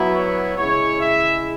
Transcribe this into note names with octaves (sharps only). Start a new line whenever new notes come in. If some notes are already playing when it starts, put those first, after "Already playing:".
Already playing: F#3 B3 E4
C#5
C#3 G#3 E4 C#5
E5